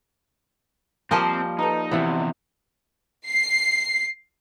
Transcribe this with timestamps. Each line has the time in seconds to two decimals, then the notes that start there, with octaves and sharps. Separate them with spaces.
1.11 F3 G3 A#3 C4 D#5 G#5 A5
1.59 D#4 A4 B4
1.91 E2 C3 E3 B3 C5 D5 E5
3.27 C7